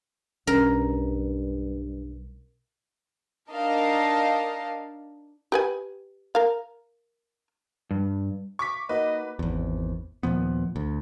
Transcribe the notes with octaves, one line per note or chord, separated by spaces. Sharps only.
B1 G2 C#4 A#4
D4 D#4 A#4 D#5 F5 A5
G4 B4 G#5
A#4 F5
G2
C#6 D6 B6
A#3 D#4 F#4 B4 D#5
G#1 E2
D#2 A#2 F3 B3
D2